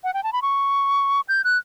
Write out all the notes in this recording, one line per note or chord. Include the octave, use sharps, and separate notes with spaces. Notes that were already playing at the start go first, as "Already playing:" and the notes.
F#5
G5
A5
B5
C#6
G6
F#6